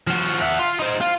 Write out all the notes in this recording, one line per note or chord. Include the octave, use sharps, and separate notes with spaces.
F3 F#4
E5 F#5
F4
D#4 C5
F4